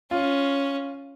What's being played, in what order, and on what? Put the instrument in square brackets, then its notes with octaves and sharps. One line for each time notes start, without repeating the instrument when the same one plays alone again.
[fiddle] C#4 [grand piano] F4